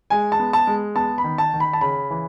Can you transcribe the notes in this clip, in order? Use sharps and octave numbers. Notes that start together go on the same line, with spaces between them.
G#3 G#5
A5
B3
A5
G#3
B3 A5
B5
D#3
A5
D#3
B5
A5
C#3 B5
E3